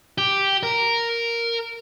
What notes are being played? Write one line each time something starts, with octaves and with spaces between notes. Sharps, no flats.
G4
A#4